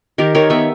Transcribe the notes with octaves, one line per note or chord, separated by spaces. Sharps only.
D#3 G4 A#4
D#3 A#4 C#5
B3 C#5 E5